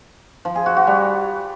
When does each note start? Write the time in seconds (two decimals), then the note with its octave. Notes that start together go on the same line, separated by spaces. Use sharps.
0.45 F3
0.55 G#4
0.66 F#4
0.76 F#4
0.87 G3